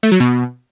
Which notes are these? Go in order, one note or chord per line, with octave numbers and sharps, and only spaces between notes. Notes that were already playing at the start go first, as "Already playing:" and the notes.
A3
F#3
B2